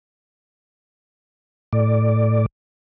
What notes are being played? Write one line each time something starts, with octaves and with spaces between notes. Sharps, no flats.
A2 D5